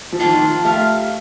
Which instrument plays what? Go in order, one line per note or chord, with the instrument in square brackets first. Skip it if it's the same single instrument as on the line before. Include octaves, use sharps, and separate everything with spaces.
[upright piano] F3
[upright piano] D#3 [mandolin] A#3 D4 F4
[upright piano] D#3
F3
[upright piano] A3 [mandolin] G4 A#4 F5